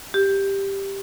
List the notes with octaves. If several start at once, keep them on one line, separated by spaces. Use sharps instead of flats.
G4